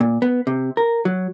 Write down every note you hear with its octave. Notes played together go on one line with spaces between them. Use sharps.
A#2
B3
C3
A#4
F#3